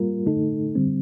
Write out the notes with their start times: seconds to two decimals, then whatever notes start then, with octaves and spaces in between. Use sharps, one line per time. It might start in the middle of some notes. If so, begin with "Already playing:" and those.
Already playing: G3 A#3 F4 A#4
0.26 D3 A3 D#4 A4
0.75 D3 G3 C4